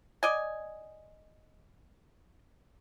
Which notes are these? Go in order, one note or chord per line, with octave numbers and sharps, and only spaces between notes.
D5 D#5 G#5